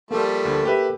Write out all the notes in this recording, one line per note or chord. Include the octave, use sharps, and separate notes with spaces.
F3 G3 A3 A#3 A4
D2
G4 B4 E5